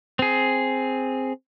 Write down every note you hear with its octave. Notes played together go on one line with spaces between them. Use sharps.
C4 G#4